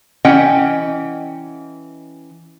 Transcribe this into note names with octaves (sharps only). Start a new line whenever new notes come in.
E3 C#4 D#5 F#5 G5